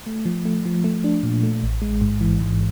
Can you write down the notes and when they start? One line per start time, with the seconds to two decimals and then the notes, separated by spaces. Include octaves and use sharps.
0.07 A3
0.25 F3
0.45 A3
0.65 F3
0.84 A3
1.04 D4
1.23 A#2
1.43 A3
1.63 A1
1.82 G#3
2.01 G#2
2.21 E3
2.41 G#2